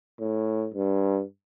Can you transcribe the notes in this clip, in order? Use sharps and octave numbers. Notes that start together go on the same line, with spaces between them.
A2
G2